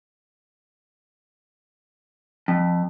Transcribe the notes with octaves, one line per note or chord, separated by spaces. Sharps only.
F2